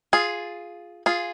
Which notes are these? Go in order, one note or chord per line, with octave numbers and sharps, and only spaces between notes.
F4 G#4
F4 G#4